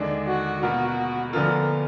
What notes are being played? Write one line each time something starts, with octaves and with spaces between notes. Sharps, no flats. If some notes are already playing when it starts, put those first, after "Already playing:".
Already playing: D#2 D3 G#3 D4
F#4
B2 A#3 F4 F#4
D2 D3 F3 B3 F4 A#4